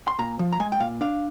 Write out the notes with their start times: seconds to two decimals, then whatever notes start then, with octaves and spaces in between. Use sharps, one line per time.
0.08 C6
0.19 A#2 A#5
0.39 F3
0.52 A#5
0.60 G#3 G#5
0.72 G5
0.80 A#2 F5
1.01 D4 F5